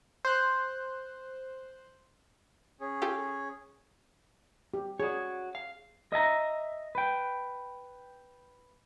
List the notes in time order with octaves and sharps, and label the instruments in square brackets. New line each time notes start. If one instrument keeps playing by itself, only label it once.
[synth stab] C5 F#6
[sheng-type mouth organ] C#4 G#4
[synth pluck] F4 G4 A4
[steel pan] G4
[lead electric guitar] F#4 C#5 [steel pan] G#4 D5
[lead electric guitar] F5
[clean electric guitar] D#5 E5 A5 A#5
B4 G5